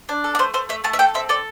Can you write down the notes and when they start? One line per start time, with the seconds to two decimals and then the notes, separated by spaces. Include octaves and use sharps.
0.09 D4
0.24 A4
0.35 D5
0.39 A3 C5
0.54 A3 C5
0.69 A3 E5
0.84 A3 A5
0.93 E5
0.99 A4 G5
1.14 C4 E5
1.29 A4 D5